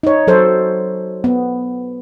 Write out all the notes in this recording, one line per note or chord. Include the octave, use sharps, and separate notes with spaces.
D#4 C#5
F#3 A4 C5
B3